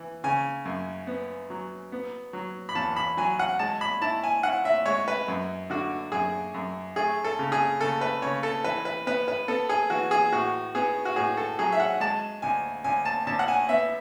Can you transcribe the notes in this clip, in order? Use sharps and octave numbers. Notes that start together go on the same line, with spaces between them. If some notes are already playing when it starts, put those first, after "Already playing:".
Already playing: E3
C#3 G#5
F#2
B3
F#3
B3
F#3
B5
E2 A5
B5
F#3 G#5
F#5
G#3 A5
B5
E4 A5
G#5
E4 F#5
E5
G#3 C#5
B4
F#2
D3 F#4
F#2 G#4
F#2
A3 G#4
A4
C#3
G#4
C#3 A4
B4
C#3 C#5
A4
E3 B4
B4
B3 B4
B4
B3 A4
G#4
E3 F#4
G#4
A2 F#4
B3 G#4
F#4
A2 G#4
A4
F#3 G#4
E5
F#5
G#3 A5
D2 G#5
D2 G#5
A5
D2 A5
F#5
G#5
B3 E5